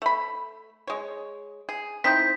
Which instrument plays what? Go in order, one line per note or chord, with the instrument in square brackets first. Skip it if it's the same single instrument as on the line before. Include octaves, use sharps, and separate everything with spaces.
[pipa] A3 B5
G#3 C#5
G#4
[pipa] C4 D#4 E4 [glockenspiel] G6 B6